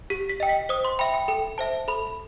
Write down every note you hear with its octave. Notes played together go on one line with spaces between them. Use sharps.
G4 B6
B6
D#5 G5
B6
C5 D#6
C6
E5 G5 B5
G5
A4 G5
C5 E5 A5
A4 B5